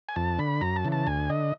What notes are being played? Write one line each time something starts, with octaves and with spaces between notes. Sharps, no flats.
G#5
F2 A5
D3 B5
F#2 A#5
A5
C#3 E3
A5
D2 G#5
D3 D#5